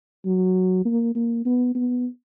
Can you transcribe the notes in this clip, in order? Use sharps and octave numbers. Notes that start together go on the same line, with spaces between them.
F#3
A#3
A#3
B3
B3